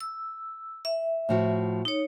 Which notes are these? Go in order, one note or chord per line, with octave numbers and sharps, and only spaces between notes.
E6
E5
A2 F3 F#4
D#4 C#5